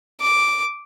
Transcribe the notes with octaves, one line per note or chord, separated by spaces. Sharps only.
D6